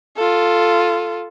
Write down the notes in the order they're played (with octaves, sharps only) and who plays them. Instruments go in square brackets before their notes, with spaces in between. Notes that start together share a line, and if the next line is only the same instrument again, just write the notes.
[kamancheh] F4 A4